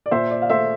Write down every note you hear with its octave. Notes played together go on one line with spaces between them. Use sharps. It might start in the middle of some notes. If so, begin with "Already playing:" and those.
D5
A#2 C5 E5
D5
F5
A3 C5 E5